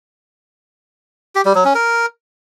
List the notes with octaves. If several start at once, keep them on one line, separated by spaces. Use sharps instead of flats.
G4
G3
F#3
C#4
A#4